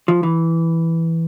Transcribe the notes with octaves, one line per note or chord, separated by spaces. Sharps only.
F3
E3